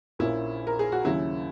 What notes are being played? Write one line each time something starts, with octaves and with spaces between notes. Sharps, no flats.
A#1 A#2 A#3 C#4 E4
A#4
G#4
F#4
D#2 C#3 F#3 C#4 E4